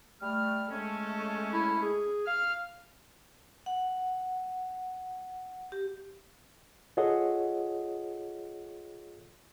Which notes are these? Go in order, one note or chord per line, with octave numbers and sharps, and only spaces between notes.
G3 A3 F6
G#3 A3 C#4 A4
E4
G#4
F5 F6
F#5
G4
F4 G#4 A4 C#5 D#5 F#5